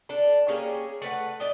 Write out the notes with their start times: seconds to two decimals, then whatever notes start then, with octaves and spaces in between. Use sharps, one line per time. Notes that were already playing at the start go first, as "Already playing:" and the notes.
0.09 D4 A4
0.48 A#3 C#4 G4 G#4
1.02 A3 B4 F#5
1.40 D#4 D5